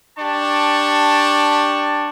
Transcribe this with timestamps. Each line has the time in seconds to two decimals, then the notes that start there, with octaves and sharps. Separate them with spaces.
0.18 D4 G4 A5 C#6